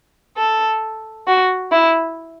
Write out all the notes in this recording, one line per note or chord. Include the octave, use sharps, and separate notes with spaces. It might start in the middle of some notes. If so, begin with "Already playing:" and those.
A4
F#4
E4